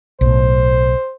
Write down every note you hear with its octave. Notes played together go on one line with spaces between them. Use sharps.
B1 A2 C5